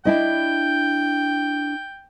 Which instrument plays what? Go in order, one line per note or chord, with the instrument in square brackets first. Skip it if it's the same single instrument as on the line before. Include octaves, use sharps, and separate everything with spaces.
[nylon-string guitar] D4 E4 D#5 [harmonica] G5